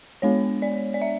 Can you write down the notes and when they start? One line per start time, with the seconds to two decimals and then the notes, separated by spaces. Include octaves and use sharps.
0.22 G#3 B3 D4 C#5
0.62 D5
0.94 D5
1.01 E5